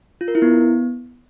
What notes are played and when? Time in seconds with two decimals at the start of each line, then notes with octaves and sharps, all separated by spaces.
0.21 F4
0.28 A#4
0.35 E4
0.42 B3